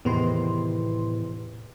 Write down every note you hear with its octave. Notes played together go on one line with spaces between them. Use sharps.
E2 A2 C3 D#3 B3 B4 C6